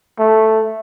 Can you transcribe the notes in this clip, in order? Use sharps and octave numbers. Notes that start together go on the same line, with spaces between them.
A3